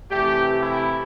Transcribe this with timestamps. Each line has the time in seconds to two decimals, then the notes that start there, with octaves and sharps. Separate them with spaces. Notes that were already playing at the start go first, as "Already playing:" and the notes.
0.11 C3 E3 A3 G4
0.62 E4